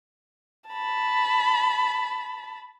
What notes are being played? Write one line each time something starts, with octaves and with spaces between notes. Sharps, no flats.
A5 B5